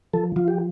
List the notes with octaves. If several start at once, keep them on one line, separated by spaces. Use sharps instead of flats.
F3 A4
F3 F4
G4